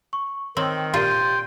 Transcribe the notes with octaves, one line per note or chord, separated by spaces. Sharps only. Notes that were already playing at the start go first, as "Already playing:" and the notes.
C#6
D#3 C4 C#5 E6 F#7
A#2 F4 G4 G5 C6 A6 D#7